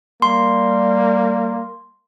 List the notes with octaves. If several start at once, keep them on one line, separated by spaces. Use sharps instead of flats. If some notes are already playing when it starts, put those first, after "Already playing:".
G3 A#3 C6